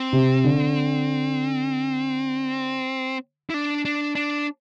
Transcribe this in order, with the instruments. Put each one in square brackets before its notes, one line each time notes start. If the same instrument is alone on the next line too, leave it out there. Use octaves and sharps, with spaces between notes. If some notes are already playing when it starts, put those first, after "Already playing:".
Already playing: [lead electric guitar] C4
[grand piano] C3
D3
[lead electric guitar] E4
D4
D4
D4